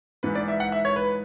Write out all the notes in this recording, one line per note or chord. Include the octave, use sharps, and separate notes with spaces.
G#2 E3 B4
D5
E5
F#5
E5
C#5
B4